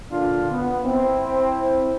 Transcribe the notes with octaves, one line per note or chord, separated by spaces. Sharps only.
A#2 D3 D4 F4
B3
C4 E4